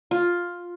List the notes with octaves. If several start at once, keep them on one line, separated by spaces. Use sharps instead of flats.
F4